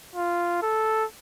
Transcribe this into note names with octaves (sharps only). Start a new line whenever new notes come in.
F4
A4